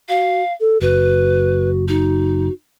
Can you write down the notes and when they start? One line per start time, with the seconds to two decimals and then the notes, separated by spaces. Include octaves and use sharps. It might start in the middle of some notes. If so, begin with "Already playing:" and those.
0.09 F#4 F5
0.60 A4
0.82 F#1 F#4 B4
1.88 D#4 F#4